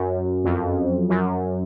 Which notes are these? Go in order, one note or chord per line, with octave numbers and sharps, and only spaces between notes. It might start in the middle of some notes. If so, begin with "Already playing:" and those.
Already playing: F#2
F2
F#2